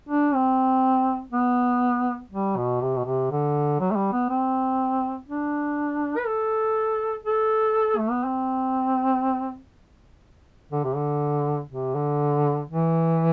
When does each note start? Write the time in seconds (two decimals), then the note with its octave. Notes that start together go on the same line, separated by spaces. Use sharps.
0.09 D4
0.34 C4
1.33 B3
2.31 G3
2.57 B2
2.81 C3
2.97 B2
3.05 C3
3.31 D3
3.80 F#3
3.91 A3
3.96 G3
4.13 B3
4.30 C4
5.28 D4
6.18 B4
6.27 A4
7.26 A4
7.97 A3
8.11 B3
8.25 C4
10.72 D3
10.84 C3
10.96 D3
11.70 C3
11.95 D3
12.70 E3